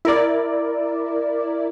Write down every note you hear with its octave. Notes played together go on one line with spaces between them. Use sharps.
E4 A#4 D5